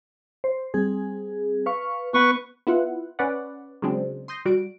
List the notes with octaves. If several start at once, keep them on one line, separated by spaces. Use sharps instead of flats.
C5
G3 C4 G#4
B4 F5 C#6
B3 B4 F#5 C#6
B3 E4 F4 F#5
C#4 B4 D5 F#5
C#3 F#3 G#3 C4 D4
C6 D#6 G6 A#6
G3 F#4 D7